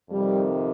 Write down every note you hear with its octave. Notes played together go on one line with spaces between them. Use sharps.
F2 C3 D#3 G3